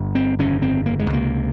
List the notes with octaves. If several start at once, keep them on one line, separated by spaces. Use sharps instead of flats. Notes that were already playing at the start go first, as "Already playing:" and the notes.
Already playing: G1 G2
C4
G1 F2 C#3 C#4
C4
A#3
G#3
C#2 C3 A#3